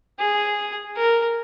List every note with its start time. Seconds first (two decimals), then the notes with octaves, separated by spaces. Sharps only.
0.19 G#4
0.96 A#4